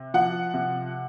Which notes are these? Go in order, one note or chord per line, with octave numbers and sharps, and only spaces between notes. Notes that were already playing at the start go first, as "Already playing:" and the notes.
Already playing: C3
F3 F#5
C3